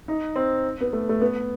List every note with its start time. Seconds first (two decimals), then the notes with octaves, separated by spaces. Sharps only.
0.08 D#4
0.36 C4
0.81 B3
0.93 A3
1.09 A3
1.21 B3